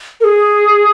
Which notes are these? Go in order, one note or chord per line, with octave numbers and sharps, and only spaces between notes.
A#4
G#4